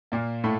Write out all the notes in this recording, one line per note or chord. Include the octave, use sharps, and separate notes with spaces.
A#2 A#3
A2 A3